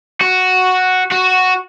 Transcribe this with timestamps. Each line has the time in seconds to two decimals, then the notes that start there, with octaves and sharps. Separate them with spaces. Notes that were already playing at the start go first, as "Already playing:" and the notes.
0.21 F#4
1.11 F#4